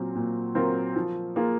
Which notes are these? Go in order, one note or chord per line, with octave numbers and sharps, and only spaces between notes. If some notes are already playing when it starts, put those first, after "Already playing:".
Already playing: A#2 F#3 C4 F4
A#2
F#3 C4 F4 A#4
F3
A#3 F4 G#4